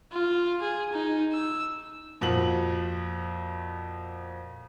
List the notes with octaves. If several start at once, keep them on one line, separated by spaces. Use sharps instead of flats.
F4
G#4
D#4
E6
F2 A#2 F3 F#4 F#7